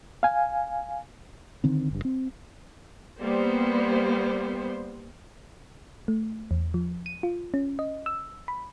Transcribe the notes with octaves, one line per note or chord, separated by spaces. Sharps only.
F5 G#5
D3 D#3 C4
F#1 G2
C4
G3 A#3 B3 C5
A3
E2
F3
D#7
F4
C#4
D#5
E6
B5